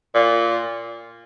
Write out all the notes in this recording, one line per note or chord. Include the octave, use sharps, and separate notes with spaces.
A#2